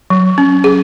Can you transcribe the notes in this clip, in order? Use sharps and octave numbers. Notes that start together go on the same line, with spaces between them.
F#3
C#4
G#4